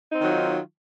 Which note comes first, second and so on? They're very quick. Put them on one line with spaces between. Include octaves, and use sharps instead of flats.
D#4 C4 D#3 F#3 F4